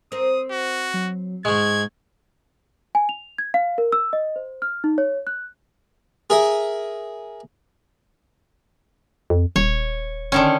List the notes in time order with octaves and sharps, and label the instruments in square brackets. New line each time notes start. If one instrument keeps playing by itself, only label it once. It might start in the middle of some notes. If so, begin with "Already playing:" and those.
[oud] C4 A#4 [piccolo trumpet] D#6
[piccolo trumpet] F#4
[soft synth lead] F#3
[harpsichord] G#2 G#3 [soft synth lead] C#6 [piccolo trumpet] G#6
[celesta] G#5
F7
G#6
F5
A#4
E6
D#5
C5
F6
D#4
C#5
F#6
[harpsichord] G#4 A#4 E5
[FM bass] F2
[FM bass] D#1 [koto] C#5
[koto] D3 D#3 C#4